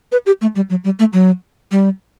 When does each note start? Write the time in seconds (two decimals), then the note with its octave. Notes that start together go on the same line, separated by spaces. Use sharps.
0.12 B4
0.26 G4
0.41 A3
0.56 G3
0.70 F#3
0.84 G3
0.99 A3
1.13 F#3
1.72 G3